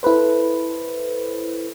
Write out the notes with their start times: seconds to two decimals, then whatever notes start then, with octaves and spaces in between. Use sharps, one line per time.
0.03 E4 A4 B4 C5